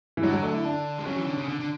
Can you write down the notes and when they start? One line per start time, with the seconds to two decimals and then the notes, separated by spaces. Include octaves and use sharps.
0.17 E3
0.23 D3 F#3
0.33 F#3
0.43 A3
0.53 E4
0.65 D4
0.98 G#3
1.06 F#3 C#4
1.17 E3
1.26 D3
1.38 C#3
1.48 D3
1.60 D3